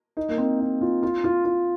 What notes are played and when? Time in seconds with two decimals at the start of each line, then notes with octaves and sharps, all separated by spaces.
0.17 D#4
0.29 A#3
0.38 C4
0.60 D#4
0.81 F4
1.03 F4
1.24 F4
1.45 F4